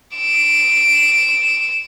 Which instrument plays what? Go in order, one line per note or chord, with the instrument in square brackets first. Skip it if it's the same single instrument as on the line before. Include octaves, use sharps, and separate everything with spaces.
[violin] D7 E7